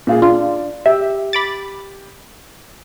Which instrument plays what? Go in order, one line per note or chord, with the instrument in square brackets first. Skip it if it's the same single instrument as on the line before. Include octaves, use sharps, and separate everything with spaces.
[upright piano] A#2 F4 G#4
[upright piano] D4 [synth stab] F4
[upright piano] G4 [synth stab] E5
[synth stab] B5 D6 A6